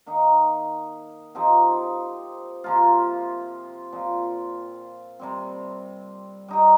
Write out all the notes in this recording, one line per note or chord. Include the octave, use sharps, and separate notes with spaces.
D#3 A#3 D#4
F3 C4 D#4 G4
C3 F3 A#3 F4
A#2 F3 C4
C3 G3 C4
G3 D#4 G4